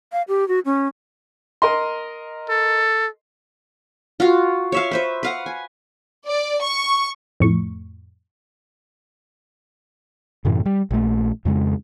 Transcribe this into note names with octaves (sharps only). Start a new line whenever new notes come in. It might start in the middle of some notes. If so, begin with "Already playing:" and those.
F5
G4
F#4
C#4
A#4 D#5 C6
A4
F4 F#4 F5
C#5 E5 F5
B4 C5 E5
B4 F5 F#5
G#5
D5
C#6
F2 A2 C#6
F#2 A2 C3 E3
G3
A#1 A3
F2 C#3 G#3